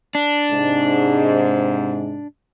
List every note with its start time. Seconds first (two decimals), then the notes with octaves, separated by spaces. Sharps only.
0.15 D4
0.52 G#2 C3